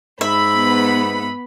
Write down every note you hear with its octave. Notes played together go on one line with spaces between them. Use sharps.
G#2 E5 B5
B3